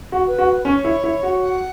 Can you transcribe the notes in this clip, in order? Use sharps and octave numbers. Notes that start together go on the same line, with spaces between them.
F#4
B4
F#4
C#4 C#5
E4
E4
F#4
F#5